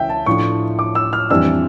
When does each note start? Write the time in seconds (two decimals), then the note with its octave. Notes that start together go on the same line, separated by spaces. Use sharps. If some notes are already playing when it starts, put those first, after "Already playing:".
Already playing: C#2 E3 E5 G5
0.09 A5
0.26 A2 F3 A3 D4 C#6
0.79 D6
0.95 E6
1.13 F6
1.30 F2 E3 G3 D4 E6